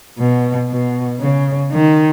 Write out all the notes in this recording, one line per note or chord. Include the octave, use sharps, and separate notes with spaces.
B2
B2
C#3
D#3